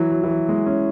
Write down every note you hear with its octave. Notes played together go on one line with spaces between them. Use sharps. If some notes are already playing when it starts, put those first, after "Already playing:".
Already playing: E3 F#3
F#3
E3
F#3
G#3
C#4